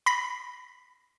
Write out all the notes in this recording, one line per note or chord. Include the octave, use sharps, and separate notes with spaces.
B5 A#6 B6